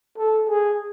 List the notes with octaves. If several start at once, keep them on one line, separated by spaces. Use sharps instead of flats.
A4
G#4